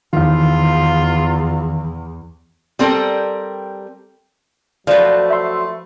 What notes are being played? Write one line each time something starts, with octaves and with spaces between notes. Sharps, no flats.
E2 D#3 E3 F4 F5
G3 C4 A4 A#4
F3 F#3 A3 F#4 B4 C5 D5
E5 C6